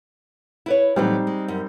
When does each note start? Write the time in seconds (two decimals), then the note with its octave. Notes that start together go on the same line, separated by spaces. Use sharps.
0.66 E4 B4 C#5
0.96 A2 E3 F#3 G3 C4 D#4
1.27 G#3
1.48 F#2